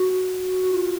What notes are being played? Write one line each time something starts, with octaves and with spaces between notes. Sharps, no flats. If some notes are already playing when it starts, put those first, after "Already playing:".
Already playing: F#4
F#4
F4